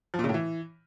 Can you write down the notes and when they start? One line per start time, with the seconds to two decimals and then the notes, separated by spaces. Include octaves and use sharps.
0.14 F3
0.19 A#2
0.24 C#3
0.29 A2
0.34 E3